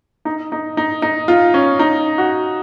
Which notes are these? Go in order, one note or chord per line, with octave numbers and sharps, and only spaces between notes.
D#4
D#4
D#4
D#4
F4
C#4
D#4
F#4